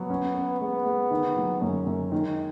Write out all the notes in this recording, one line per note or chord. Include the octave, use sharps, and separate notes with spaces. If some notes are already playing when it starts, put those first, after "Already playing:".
Already playing: F#3 B3
C#4
B4
G#3 B3
G#3
D#3
F#3
F#2 C#4
F#2
D#3 G#3